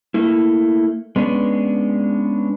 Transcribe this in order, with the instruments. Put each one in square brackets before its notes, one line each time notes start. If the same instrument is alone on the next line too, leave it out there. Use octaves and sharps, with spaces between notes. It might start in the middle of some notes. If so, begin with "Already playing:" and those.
[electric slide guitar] A3 A#3 E4
G#3 B3 C#4 D4